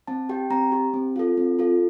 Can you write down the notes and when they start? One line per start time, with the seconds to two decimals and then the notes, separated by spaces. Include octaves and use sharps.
0.08 C4 A5
0.29 G4 G5
0.50 C4 A#5
0.72 G4
0.94 C4
1.16 F4 A4
1.37 C4
1.59 F4 A4